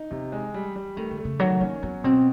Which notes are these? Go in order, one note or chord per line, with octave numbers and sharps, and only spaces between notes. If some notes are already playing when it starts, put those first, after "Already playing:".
Already playing: D#4
C3 E3
G#3
G3
G3
D#3 A3
D3
A3
C#3
D#3 F#3
A#3 C#4
F#3 B3
B2 C4